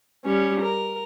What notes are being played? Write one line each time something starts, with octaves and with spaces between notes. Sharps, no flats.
G3 C#4
A#4